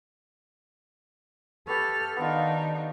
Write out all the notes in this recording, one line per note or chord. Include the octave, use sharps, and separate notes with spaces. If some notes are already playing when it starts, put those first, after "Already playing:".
G4 A4 B4 C#5 F6
D#3 B3 D4 D#4 F4